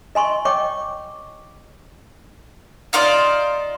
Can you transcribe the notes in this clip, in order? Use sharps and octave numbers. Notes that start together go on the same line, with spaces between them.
D#5 G#5 C6 C#6
C#5 D#5 G5 C#6 D6
D#4 F4 C5 D5